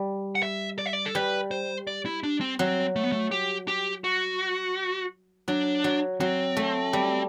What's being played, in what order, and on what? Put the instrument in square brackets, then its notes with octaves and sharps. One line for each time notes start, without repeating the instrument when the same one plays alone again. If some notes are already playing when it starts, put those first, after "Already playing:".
Already playing: [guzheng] G3
[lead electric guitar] F#5
E5
D5
E5
D5
A4
[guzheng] G3 [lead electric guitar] B4
[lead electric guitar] C5
D5
E4
D4
C4
[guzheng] F#3 [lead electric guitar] C4
[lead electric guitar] A3
B3
A3
G4
G4
F#4
[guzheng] F#3 [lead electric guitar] D4
[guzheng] F#3
[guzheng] F#3 [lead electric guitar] C4
[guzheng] A3
G3